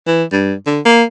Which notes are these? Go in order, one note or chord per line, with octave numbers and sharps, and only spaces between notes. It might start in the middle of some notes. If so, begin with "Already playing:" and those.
E3
G2
D3
A#3